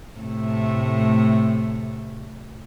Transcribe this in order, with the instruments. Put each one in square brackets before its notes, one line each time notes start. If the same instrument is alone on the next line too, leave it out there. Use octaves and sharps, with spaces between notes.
[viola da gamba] A2 C3 A3